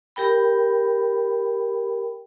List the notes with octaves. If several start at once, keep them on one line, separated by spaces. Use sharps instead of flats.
G4 A#4 G5 B5